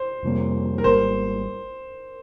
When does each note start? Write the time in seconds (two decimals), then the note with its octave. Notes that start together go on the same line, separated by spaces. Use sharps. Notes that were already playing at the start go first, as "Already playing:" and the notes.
Already playing: C5
0.23 F2 C3 G3 A#3
0.78 A#4
0.84 G#1 G#2 G3 A#3 C5